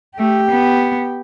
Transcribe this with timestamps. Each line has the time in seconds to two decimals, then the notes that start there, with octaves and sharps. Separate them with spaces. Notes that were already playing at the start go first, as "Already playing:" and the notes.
0.18 A3 G4
0.50 B3